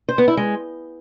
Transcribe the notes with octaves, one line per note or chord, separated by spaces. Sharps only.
C5
B3
E4
G#3